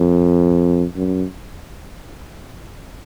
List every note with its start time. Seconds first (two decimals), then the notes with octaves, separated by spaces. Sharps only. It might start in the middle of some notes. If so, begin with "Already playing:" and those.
Already playing: F2
0.96 F#2